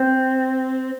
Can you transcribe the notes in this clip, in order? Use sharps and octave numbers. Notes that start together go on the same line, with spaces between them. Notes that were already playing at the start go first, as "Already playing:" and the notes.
Already playing: C4